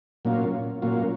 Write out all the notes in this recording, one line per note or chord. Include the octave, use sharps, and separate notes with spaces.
A#2 F#3 A#3 C#4 F4
A#2 F#3 A#3 C#4 F4